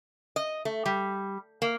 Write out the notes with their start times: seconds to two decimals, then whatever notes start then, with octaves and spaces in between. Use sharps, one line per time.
0.36 D#5
0.65 A3
0.86 G3
1.62 A#3